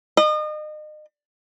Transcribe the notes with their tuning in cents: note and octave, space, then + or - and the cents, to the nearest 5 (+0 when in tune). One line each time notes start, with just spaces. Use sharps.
D#5 -35